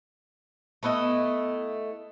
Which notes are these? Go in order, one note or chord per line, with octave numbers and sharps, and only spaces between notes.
A3 B3 E4 D#5